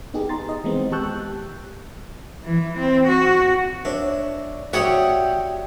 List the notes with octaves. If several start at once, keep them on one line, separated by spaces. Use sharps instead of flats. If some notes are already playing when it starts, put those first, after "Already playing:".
B3 D#4 G4 G#4
A#5 C6 A6
D#5
D#3 E3 G#3 B3 C4
G4 A5 C#6 E6 F#6 G6
E3
C4
F#4
D4 C#5 D5 E5
F#4 G4 C#5 D5 E5 F#5 G5 D#6